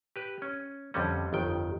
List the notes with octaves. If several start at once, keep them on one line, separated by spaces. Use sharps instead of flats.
G4 B4
C#4
F2 D3 G3 C#4
G1 F2 D#3 G5